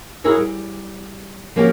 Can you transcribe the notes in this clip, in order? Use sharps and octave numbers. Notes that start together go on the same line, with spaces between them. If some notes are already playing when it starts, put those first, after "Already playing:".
E4 F#4 G#4 A#4 C#5
G3
F3 A#3 C#4 F#4 G4